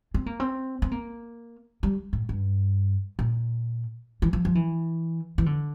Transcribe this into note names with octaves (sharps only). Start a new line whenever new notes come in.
C4
A#3
C4
C4
A#3
G3
A2
G2
A#2
E3
F3
F3
E3
E3
D3